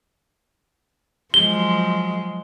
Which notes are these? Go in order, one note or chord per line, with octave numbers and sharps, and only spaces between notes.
F3 F#3 G#3 G7